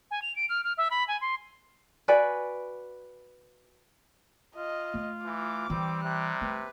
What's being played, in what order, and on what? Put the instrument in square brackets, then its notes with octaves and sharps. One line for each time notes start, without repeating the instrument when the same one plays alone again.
[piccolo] G#5
F7
D7
F6
F6
E5
B5
G#5
C6
[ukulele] F#4 B4 D5 G#5
[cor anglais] F4 [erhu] D#5
[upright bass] A3
[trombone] E3 [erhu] D6
[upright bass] E3 [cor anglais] G3 [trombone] C4
[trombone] C3 [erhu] F#6
[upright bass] A3 [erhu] B4